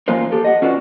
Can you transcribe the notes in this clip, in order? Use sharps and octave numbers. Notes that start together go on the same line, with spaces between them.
E3 A#3 C#4 F4 A#4 C5
G4 A4
D#5 F#5
C#4 F4 F#4 B4 C#5 D5